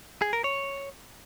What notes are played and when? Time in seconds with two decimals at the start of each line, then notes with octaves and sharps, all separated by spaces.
0.22 G#4
0.33 A#4
0.44 C#5